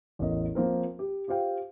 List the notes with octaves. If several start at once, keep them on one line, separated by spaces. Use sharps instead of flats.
A1 E2 A#4 D#5
F3 A#3 C4 A#4
G4
F4 G4 C5 F5 G5